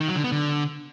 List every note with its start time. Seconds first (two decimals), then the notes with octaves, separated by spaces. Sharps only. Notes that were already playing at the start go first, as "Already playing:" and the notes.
0.01 D#3
0.08 F#3
0.16 D3
0.24 B3
0.32 D3